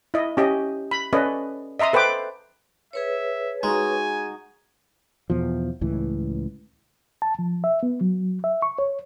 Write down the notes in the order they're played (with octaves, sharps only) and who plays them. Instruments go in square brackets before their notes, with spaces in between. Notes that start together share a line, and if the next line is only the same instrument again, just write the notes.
[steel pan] E4 D#5
C#4 G4 D#5
B5
C#4 A4 B4 D5 D#5
D#5 E5 A#5 C6 D#6
A4 B4 C5 G5 D6
[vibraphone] G#4 B4 C#5 [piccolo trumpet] E5
[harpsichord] G#3 [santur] D#4 F#4 [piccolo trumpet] G#5
[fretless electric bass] E2 B2 F3
C#2 A2 E3
[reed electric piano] A5
F3
E5
B3
F#3
E5
C#6
C#5